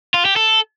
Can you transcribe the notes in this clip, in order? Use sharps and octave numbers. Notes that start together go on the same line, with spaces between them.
F4
G4
A4